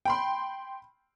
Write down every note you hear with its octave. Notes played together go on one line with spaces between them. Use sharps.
G5 B5 C6